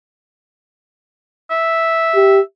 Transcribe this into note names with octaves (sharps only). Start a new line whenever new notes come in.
E5
G4